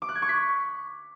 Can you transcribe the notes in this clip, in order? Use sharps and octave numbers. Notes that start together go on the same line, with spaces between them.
D6
F#6
G#6
C#6
B6